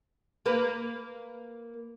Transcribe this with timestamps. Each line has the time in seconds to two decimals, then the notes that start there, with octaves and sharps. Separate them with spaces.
0.46 A#3 B4